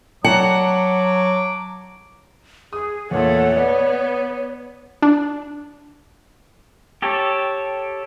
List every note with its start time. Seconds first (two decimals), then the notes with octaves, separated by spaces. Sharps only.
0.24 F#3 F#5 A5 A#5 D6
2.73 G#4 D#6
3.11 E2 A#2 A3 C#5 F#5
3.57 B3 D5
5.02 D4
7.02 G4 A4 C#5